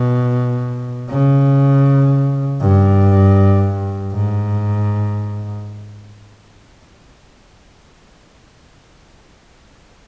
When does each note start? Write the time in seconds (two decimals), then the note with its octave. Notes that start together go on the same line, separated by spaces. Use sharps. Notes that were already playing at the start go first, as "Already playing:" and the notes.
Already playing: B2
1.09 C#3
2.61 G2
4.13 G#2